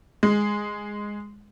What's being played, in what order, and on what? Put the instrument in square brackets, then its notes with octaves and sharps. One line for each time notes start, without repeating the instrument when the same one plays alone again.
[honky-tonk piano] G#3